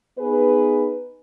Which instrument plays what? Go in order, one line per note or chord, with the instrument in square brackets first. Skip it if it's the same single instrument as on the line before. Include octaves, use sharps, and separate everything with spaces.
[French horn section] B3 D#4 G#4 B4